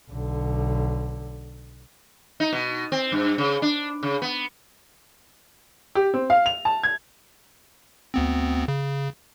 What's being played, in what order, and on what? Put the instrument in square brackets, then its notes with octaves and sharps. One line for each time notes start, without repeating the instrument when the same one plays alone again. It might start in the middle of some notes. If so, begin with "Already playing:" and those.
[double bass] B1 D3
[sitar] D#4
B2
C4
G2
C#3
D4
C#3
B3
[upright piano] G4
C4
F5
F7
A5
G#6
[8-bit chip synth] D2 B3 C4
C#3